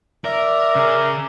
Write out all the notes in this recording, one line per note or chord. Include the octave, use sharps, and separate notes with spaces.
A#4 D5 E5
C#3 G#4 A#4